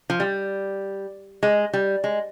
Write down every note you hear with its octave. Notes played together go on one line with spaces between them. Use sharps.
F3
G3
G#3
G3
G#3